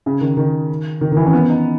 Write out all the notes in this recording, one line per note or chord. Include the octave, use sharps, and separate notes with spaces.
C#3
D#3
D#3
D#3
D#3
E3
C#4
B3
D#4